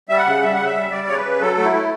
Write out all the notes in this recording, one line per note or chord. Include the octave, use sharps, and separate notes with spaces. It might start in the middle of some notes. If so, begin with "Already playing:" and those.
G3 E5
F#5
C#3
G3 E5
C#3 F#5
E5
G3
G3 D5
C#3 C#5
B4
C#3
F#3 A4
A3
E4
A3